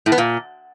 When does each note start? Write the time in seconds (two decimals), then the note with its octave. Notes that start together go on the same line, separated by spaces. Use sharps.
0.06 A2
0.12 B3
0.18 A#2